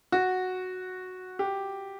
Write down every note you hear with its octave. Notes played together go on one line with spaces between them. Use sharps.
F#4
G4